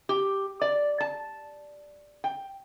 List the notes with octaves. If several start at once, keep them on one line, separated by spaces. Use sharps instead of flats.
G4
D5
A5
G5